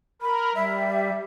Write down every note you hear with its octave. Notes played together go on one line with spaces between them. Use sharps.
A#4 B5
G3 E5